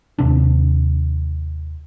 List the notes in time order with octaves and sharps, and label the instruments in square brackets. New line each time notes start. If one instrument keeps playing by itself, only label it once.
[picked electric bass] D#2 C3 D4